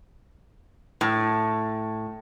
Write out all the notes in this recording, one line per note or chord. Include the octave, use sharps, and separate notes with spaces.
A2